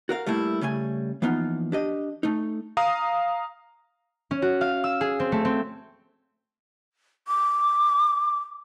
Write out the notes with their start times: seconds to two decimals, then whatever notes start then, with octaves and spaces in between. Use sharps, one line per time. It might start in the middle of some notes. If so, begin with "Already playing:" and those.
0.09 F#4 A#4 F5
0.26 G3 A3 A#3 E4
0.61 C#3 G3 A3 G#5
1.22 E3 F3 A#3 B3 D#4 F4
1.72 D4 G4 D#5
2.23 A3 D#4
2.77 F5 A#5 D#6
4.31 C#4
4.42 F#4
4.61 F5
4.84 E6
5.01 G#4
5.20 C4
5.32 A3
5.45 C4
7.28 D6